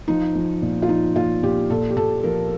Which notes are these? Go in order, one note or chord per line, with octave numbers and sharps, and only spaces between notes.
F3 D#4
F3
A#2
F4
F3 D#4
A#2 F4
A#2 G4
A#2 A4
G4
A#2 A4
F3 A#4